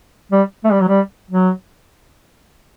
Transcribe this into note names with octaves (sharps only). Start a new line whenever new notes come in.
G3
A3
G3
F#3
G3
F#3